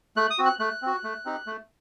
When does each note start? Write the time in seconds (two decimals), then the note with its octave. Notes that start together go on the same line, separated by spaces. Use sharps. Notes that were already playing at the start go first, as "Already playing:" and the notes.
0.17 A3 F#6
0.30 D#6
0.38 C4 F#4
0.45 F#6
0.59 A3 F#6
0.82 C4 F#4
1.04 A3
1.25 C4 D#4 G4
1.46 A3